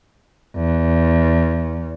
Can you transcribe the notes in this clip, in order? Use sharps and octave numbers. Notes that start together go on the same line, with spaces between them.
E2